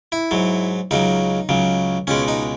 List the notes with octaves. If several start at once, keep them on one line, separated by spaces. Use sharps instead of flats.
E4
G#2 F#3
C#2 C#3 F#3 D#4
C#2 C#3 F#3
C#2 B2 G#3 C#4
D#4